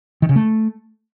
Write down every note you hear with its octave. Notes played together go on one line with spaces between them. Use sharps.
D#3
C#3
A3